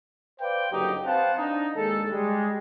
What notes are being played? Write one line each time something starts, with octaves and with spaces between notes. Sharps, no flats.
B4 C5 D5 F5 G5
F#1 G2 D3 F#3 D#4 G4
C4 B4 C5 F5 F#5 A5
D4 D#4
D#2 G#3 A4
G3 G#3